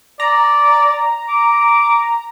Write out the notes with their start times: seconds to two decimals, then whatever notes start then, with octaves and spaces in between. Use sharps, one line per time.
0.20 D5 A#5
1.28 D6